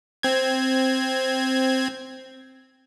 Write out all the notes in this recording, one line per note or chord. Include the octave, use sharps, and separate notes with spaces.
C4 G#6